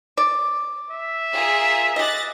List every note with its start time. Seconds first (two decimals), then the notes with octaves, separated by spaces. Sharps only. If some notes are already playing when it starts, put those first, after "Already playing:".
0.17 D5
0.90 E5
1.31 F4 G#4 A#4
1.96 G4 D#5 F#6 A6 A#6